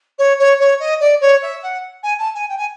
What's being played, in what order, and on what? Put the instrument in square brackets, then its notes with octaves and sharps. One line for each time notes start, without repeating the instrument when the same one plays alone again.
[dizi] C#5
C#5
C#5
D#5
D5
C#5
E5
F#5
G#5
A5
G#5
G5
G#5